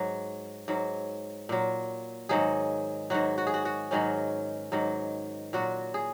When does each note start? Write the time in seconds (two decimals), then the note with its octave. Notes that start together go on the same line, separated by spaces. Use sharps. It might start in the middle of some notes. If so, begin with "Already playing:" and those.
Already playing: G#2 F#3
0.68 G#2 F#3
1.49 A#2 F#3
2.29 G#2 D#3 F#3 G#4
3.10 G#2 D#3 F#3 F#4
3.38 F#4
3.47 G#4
3.54 F#4
3.65 F#4
3.91 G#2 D#3 F#3 C#4
4.72 G#2 D#3 F#3
5.53 A#2 F#3 F#4
5.94 G#4